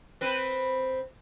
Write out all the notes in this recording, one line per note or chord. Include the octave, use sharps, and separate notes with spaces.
C4 B4